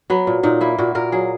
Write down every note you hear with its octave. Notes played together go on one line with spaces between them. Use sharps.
F#3 B3
A#2
A#2 D#4
A#3 E4
A#2 F#4
A#2 A#4
F#3 G#4